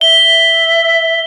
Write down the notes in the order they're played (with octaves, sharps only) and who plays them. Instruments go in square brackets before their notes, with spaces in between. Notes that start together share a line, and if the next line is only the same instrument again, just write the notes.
[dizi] E5 [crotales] G7